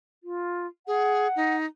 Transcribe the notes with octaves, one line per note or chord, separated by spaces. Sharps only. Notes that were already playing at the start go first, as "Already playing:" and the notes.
F4
G#4 F#5
D#4